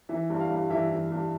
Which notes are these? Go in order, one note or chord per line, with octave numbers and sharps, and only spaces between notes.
E3 E5
G2
F5
G2
E3 E5
E3
G2